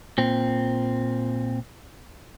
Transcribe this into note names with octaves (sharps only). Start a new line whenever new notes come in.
A#2 C4